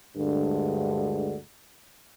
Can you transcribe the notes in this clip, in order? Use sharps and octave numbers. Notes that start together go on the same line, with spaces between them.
D2 G2 D3 G#3